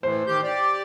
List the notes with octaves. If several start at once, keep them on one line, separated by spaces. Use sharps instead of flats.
A2 E3 C5
D#3 G4 G6
G4 D5